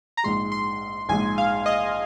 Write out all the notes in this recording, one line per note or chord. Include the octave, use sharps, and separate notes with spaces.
A#5
A#1 G#2 G#3 C6
C6
A#1 G#2 G#3 G#5
F5
D#5